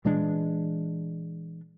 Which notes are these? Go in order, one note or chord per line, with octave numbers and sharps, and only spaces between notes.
A#2 E3 G#3 D4